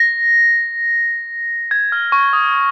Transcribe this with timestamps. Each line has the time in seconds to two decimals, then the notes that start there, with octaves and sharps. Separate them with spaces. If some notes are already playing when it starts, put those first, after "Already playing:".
Already playing: A#6
1.71 G#6
1.92 F6
2.12 C#6
2.33 D#6